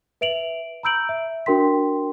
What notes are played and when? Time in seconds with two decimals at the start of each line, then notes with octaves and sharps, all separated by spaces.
0.21 B4 E5 D7 F7 F#7
0.83 A#5 B5 E6 G6 D7 F#7
1.09 E5
1.46 D4 F#4 A#4 G5 C6 B6